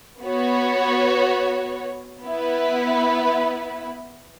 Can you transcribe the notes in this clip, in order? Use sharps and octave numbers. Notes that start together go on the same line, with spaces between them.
B3 F#4 C#5
B3 E4 B4